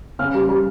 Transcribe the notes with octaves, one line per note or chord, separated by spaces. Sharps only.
C#3 F6
G3
G3